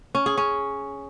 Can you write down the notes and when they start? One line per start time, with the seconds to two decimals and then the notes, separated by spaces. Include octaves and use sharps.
0.15 C#4
0.26 G#4
0.37 C#4